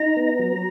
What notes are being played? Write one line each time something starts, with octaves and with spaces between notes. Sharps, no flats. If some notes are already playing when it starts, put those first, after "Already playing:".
Already playing: D#4 A#5
B3
F#3